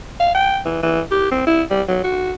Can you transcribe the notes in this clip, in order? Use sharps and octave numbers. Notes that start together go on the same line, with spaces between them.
F5
G5
E3
E3
G4
C4
E4
G3
F#3
F#4